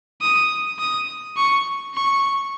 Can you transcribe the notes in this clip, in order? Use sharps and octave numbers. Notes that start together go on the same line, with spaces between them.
D#6
D#6
C#6
C#6